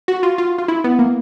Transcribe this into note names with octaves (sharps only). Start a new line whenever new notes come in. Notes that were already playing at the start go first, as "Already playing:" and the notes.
F#4
F4
F4
F4
E4
B3
A#3